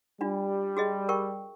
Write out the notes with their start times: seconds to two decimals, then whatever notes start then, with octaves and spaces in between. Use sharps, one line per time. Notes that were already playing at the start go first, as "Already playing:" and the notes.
0.21 G3 D4 F4
0.77 F#4 G#4 D#5
1.09 A#4 G5 C#6